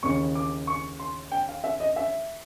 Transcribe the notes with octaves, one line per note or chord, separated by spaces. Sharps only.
D#2 C#3 E3 C#6
D6
C#6
C6
G5
F5
E5
D#5
E5